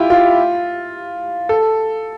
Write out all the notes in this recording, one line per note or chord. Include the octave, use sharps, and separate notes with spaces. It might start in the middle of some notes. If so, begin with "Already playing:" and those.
Already playing: E4 F4 G4
F4
A4